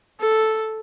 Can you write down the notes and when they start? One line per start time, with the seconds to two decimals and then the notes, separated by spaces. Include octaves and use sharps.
0.20 A4